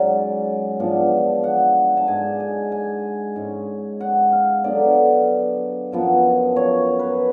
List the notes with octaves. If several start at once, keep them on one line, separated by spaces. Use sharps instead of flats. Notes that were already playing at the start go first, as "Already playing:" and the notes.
Already playing: G#2 F#3 C#4 D5
G#2 F3 B3 D4
F#5
A5
G#2 G#3 D4 G#5
G#5
G#5
G#2 G#3 C#4
F#5
F5
D3 F#3 B3 D4 D5
F#2 F3 B3
C#5
B4